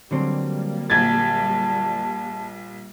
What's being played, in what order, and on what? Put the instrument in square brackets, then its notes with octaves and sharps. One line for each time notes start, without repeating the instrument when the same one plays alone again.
[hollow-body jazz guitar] D3 F#3 C4 [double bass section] G3 A#3
[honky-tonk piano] A#1 G#6 A6 [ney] A5